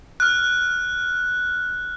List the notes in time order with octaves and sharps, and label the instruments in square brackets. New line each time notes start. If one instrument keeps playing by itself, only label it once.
[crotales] F6 F#6